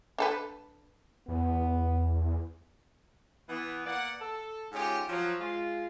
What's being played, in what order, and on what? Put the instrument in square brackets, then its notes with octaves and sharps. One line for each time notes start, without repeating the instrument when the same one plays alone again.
[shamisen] D4 A4 B4
[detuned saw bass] E2 [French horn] B3
[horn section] E3 B3
A#3 B3 D5 F#5
A4
G#2 C#4 D#4 F4 G4
F3 F#3
G#3 F4